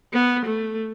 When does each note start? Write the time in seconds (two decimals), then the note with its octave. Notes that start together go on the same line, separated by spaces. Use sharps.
0.13 B3
0.45 A3